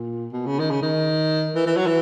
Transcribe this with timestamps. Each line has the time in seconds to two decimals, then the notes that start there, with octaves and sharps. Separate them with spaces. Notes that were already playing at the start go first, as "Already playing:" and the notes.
Already playing: A#2
0.32 B2
0.46 C#3
0.59 D#3
0.71 C#3
0.82 D#3
1.55 E3
1.66 E3
1.77 F#3
1.86 E3